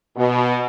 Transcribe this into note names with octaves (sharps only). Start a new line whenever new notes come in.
B2